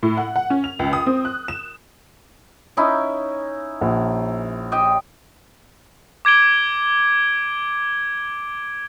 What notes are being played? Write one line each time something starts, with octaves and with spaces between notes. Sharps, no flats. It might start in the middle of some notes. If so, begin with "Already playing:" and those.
A2
F#5
F#5
C#4
F7
C#2
D#6
C4
F#6
E7
C#4 D#4 E4
A#1 F#5
G4 D#5 G5
D6 G#6 D7 G7